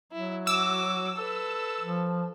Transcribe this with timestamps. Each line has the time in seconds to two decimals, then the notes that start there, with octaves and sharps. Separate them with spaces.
0.12 F#3 E4
0.47 F#4 D6 E6
1.16 A4 B4
1.81 F3